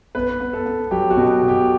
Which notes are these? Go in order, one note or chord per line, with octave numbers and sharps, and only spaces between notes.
B3 B4
B3
A4
B3
F#3 G4
F#4
B2
B2
G4